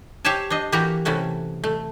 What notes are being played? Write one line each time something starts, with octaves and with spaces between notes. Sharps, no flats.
G4 C5 C#5 E5 G#5 A5
D4 C5 D#5
E3 A#3 F#4 G4 A#5
C3 E3 A3 C#4 F#4
A3